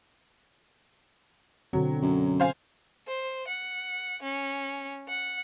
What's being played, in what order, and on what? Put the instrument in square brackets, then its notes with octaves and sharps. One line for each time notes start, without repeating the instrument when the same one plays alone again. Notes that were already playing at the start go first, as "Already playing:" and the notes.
[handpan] B2 D3 C4 [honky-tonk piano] F#3
[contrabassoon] F#2
[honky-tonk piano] C5 F5 G#5
[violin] C5
F#5
C#4
F#5